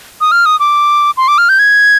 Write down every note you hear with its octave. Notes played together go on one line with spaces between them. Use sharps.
D#6
F6
D#6
D6
C6
D6
F6
G6
G#6